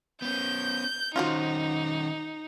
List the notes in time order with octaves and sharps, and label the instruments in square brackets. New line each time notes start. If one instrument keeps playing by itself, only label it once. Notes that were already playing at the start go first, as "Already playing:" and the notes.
[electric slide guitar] B3 C#4 [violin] G6
[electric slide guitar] D#3 C#4 [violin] D#4 [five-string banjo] F4 F#4 C5